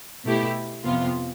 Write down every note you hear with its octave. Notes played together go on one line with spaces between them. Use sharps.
B2 A3 E4 G4
F2 C3 F3 B3 F4